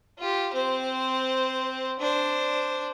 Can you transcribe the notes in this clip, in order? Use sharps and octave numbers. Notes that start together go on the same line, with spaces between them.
F4 G4
C4 C5
D4 C5